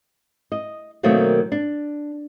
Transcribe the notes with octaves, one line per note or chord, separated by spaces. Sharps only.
D#5
B2 D#3 F#3 A3 A#3 C4
D4